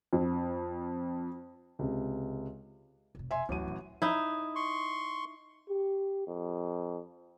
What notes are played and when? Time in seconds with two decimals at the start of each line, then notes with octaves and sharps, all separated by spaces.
0.13 F2
1.79 C#2 C3
3.15 F1 B2
3.31 E5 G#5 C6
3.49 A1 D2 G2 F#3 D#7
3.68 D#1
4.02 D#4 E4
4.55 C6 C#6
5.69 G4
6.27 F2